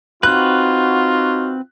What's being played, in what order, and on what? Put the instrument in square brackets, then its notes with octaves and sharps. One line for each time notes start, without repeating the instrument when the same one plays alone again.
[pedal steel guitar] C4 B4 [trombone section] D#4 F#4 [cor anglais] F4 [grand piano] F#6